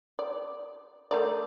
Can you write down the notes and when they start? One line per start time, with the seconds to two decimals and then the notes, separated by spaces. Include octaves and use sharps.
0.19 D5
1.11 A3 A#4 D5